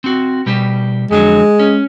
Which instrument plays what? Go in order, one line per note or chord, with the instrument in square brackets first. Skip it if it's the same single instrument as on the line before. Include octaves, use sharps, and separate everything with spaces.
[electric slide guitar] C4 F#4
B2 G3 G4
[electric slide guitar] F2 D3 F#3 [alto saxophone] G#3
[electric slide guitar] C#4